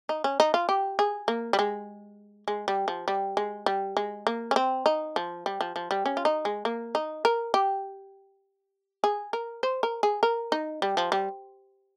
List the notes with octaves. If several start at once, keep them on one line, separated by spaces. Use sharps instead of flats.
D#4
C#4
D#4
F4
G4
G#4
A#3
G3
G#3
G#3
G3
F3
G3
G#3
G3
G#3
A#3
C#4
C4
D#4
F3
G3
F3
F3
G3
C#4
F4
D#4
G#3
A#3
D#4
A#4
G4
G#4
A#4
C5
A#4
G#4
A#4
D#4
G3
F3
G3